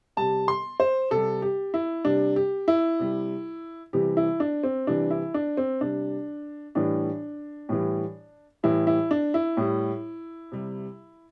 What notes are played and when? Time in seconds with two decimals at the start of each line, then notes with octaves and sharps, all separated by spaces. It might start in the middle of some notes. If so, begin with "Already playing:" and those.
0.17 C3 G3 A5
0.48 C6
0.80 C5
1.11 C3 G3 A4
1.42 G4
1.74 E4
2.05 C3 G3 D4
2.36 G4
2.68 E4
2.99 C3 G3
3.93 C3 E3 G3 G4
4.17 E4
4.40 D4
4.63 C4
4.87 C3 E3 G3 D4
5.10 E4
5.34 D4
5.57 C4
5.81 C3 G3 D4
6.75 A2 E3 G3 D4
7.69 A2 E3 G3
8.63 A2 E3 G3 E4
8.87 E4
9.11 D4
9.34 E4
9.57 A2 G3
10.52 C3 G3